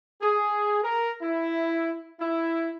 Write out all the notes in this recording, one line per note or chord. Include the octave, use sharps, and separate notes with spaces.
G#4
A#4
E4
E4